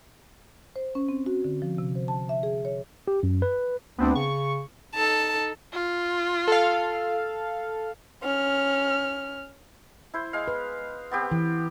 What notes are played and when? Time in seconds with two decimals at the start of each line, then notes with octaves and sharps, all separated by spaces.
0.76 C5
0.95 C#4
1.09 C4
1.26 F#4
1.44 D3
1.62 F3
1.78 C3
1.95 C5
2.08 A5
2.29 E5
2.43 G#4
2.65 C#5
3.08 G4
3.23 F#2
3.42 B4
3.98 D2 B3 C4 D4
4.15 C#3 C#6
4.95 D#4 A4 A5
5.73 F4
6.48 A4 F5
8.23 C#4 F6
10.14 E4 C5
10.33 G#3 F5
10.48 B4
11.11 B3 C4 G4
11.32 E3